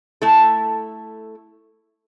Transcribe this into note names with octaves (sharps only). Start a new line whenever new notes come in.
A3 E4 A4